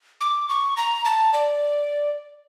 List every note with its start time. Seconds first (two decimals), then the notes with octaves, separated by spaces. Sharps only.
0.21 D6
0.49 C#6
0.77 A#5
1.05 A5
1.34 D5